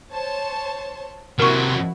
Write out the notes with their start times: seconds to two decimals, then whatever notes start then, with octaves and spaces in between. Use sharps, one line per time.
0.13 C5 C#5 A5
1.39 C3 F#3 E4 F#4 A#4 C#6